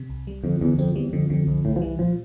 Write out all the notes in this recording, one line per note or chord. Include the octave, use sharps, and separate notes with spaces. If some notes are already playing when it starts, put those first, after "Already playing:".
Already playing: C3
C2
G3
F2 D3
E2 D3
F2 C4
E2 G3
F2 D3
F2 D3
C2 F2
C2 A2
F3
E3 G3
A#2 F3